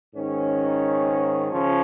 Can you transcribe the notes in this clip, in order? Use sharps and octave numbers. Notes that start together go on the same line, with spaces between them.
G#2 D#3 C#4
C#3 F3 C#4